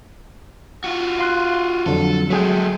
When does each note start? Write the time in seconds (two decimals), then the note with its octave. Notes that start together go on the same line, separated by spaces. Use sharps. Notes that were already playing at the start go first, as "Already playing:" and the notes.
0.84 F4 F#4
1.19 F5 C6 F#6
1.86 F2 D3 F#3 A4
2.30 F#3 G#3 A3 G#4 G5